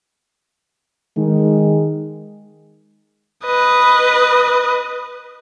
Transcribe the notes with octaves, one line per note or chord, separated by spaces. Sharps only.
D#3 G#3
B4 D#5